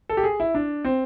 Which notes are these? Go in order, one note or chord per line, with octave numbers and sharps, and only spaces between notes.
A4
G4
G#4
E4
D4
C4